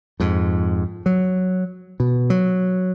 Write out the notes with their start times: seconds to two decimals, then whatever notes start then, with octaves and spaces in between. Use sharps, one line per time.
0.20 F2 G#2
1.06 F#3
2.00 B2
2.30 F#3